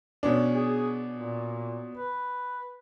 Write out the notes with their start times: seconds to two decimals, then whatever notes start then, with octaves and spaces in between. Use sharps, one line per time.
0.23 B2 C#4 D4
0.54 G#4
1.13 A#2
1.95 B4